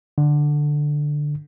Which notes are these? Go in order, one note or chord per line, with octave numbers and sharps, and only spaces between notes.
D3